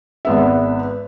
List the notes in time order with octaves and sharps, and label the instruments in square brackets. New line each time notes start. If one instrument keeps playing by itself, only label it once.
[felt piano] G#1 B3 E5